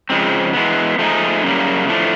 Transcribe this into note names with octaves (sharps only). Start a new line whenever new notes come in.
C#3 F3 G#3 C4
E3 G#3 B3
F3 A3 C4 D#4 G#4
F#2 C#3 G3 A#3
A2 F3 A3 D4